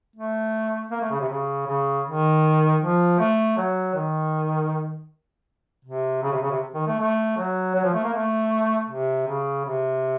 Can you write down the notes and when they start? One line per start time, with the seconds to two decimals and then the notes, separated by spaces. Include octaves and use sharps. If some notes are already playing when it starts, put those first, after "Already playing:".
0.16 A3
0.91 A#3
1.01 A3
1.11 C#3
1.20 C3
1.29 C#3
1.67 C#3
2.06 D#3
2.81 F3
3.19 A3
3.57 F#3
3.95 D#3
5.85 C3
6.23 C#3
6.32 C3
6.42 C#3
6.51 C3
6.74 D#3
6.87 A3
6.99 A3
7.38 F#3
7.75 F#3
7.84 F3
7.94 A3
8.04 A#3
8.13 A3
8.89 C3
9.27 C#3
9.65 C3